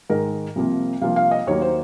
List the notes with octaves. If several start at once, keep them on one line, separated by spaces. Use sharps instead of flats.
G#2 D#3 G#3 A#4
C2 C3 F3 A#3
C2 C3 F3 A#3 F5
F5
D#5
D#2 D#3 F#3 A#3 C#5
C5